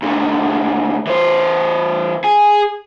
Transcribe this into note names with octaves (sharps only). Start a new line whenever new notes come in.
D#2 D3
E3 C5
G#4